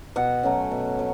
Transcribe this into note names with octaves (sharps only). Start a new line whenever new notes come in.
B2 F#5
F#3 A3 C#4
B2
F#3